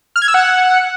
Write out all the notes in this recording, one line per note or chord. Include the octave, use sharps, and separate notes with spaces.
F6
G#6
E6
F#5